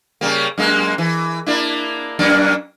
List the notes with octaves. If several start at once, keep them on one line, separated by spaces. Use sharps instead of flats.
C#3 G3 A#3
F#2 G#3 A#3
E3
A#3 D4 E4
F#2 A#3 D4